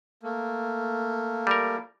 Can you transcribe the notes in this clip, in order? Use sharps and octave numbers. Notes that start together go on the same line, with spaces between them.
A3 A#3
G3 A#4